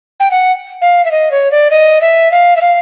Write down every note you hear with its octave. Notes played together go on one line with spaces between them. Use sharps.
G5
F#5
F5
E5
D#5
C#5
D5
D#5
E5
F5
E5
F5